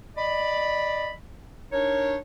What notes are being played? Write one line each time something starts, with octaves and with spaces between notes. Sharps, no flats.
D5 D#5 B5
D4 D#4 A#4 C#5